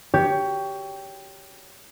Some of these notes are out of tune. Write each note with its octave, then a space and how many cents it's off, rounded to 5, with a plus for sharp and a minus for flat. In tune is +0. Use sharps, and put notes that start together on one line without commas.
G4 +0 C#5 +20